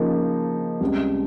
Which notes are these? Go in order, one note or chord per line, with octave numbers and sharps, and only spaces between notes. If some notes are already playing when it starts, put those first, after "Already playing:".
Already playing: C#3 F3 A#3 D#4
C#2 C3 G3